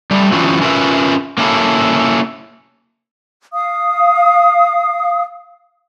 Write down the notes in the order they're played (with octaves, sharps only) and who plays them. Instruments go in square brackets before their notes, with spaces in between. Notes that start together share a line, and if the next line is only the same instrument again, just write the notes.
[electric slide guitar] G3 A3
E3 F#3 G3 B3 C#4 F4
C#4 F4 A#4 B4 E5
A#3 C#4 E4 A4
[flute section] F5 D#6